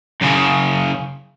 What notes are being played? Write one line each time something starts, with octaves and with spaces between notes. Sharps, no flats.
F#2 C#3